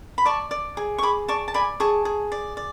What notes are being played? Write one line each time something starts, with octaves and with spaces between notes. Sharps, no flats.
B5
D5 A5 C#6
D5
G#4
C#6
G#4 B5 D6
D5 A5 C#6
A5
D5 G#5 B5
G#4 A5 C#6
G#4
D5
D5